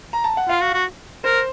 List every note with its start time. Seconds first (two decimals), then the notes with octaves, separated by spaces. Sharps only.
0.13 A#5
0.24 A5
0.37 F#5
0.48 F4 F5
0.62 F#4
0.74 F#4
1.24 A#4 C5